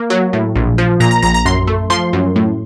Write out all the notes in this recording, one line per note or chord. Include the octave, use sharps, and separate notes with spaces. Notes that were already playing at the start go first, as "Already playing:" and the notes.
Already playing: A#3
F#3
A2
A#1
F3
A#2 A#5
A#5
A#1 A#5
A#5
F#2 C6
A3
F3 C6
F#2
A2